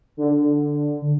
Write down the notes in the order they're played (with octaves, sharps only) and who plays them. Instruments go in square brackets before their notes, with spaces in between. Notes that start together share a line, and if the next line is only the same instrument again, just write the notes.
[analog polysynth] D3